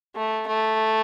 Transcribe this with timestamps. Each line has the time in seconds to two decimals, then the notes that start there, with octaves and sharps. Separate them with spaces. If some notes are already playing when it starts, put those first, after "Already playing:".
0.16 A3
0.47 A3